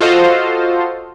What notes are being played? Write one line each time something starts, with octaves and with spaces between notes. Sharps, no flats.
F4 F#4 A4 C5 D#5 F5